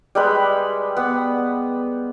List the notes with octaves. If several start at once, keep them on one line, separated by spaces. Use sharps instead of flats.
G3 G#3 B4
B3